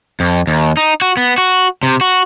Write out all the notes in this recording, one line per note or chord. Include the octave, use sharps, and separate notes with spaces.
F2
D#2
D#4
F#4
B3
F#4
C3
F#4